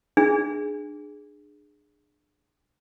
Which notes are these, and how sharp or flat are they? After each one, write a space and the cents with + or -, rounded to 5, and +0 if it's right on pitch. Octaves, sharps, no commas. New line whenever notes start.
D4 +25 G#4 +0